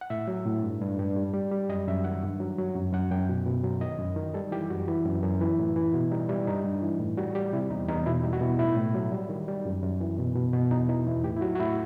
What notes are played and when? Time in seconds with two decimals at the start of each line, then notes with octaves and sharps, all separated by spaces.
0.01 F#5
0.10 A2 E5
0.28 F#3
0.46 A2
0.63 G2
0.82 G2
0.98 G2
1.16 G3
1.33 G3
1.51 G3
1.69 F#2 D#5
1.87 F#2 E5
2.04 D#3 F#5
2.23 G2
2.40 F#3
2.58 F#3
2.75 F#2
2.93 F#2 F#5
3.11 F#2 G5
3.29 B2
3.47 B2
3.64 F#3
3.81 D#3 D#5
3.99 F#2
4.16 D#3
4.34 G3 A4
4.52 E3 G4
4.70 F#2 F#4
4.88 E3
5.05 F#2
5.23 F#2
5.41 E3
5.59 A2
5.76 E3
5.94 B2 F#4
6.11 G3 D#4
6.29 G3 E4
6.47 G2 D#4
6.64 G2
6.82 E3
7.00 A2
7.18 G3 F#4
7.35 G3 G4
7.53 C3 E4
7.70 E2 D#4
7.88 E2 D#4
8.06 B2 E4
8.24 G3 D#4
8.33 F#4
8.41 B2 E4
8.59 A2 E4
8.76 A2
8.94 F#3
9.12 G3
9.29 D#3
9.48 G3
9.65 F#2
9.83 F#2
10.01 E3
10.18 B2
10.36 B2
10.53 B2
10.71 E2 D#4
10.89 E3 D#4
11.07 E2 E4
11.24 A2 G4
11.36 E4
11.41 F#3 F#4
11.55 F#4
11.60 A2 E4